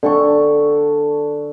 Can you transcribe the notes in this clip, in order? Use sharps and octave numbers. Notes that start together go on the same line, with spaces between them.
D3 A4 C#6